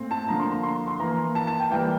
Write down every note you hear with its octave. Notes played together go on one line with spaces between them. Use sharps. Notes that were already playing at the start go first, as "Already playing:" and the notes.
Already playing: A#2 A3 C4
A5
D3 F3 A#3 A#5
C6
A#5
C6
C6
E3 A#3 A#5
A5
A5
G5
E3 G3 A#3 G5